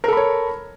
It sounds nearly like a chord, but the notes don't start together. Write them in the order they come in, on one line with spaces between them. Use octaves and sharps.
A#4 A4 B5 C#5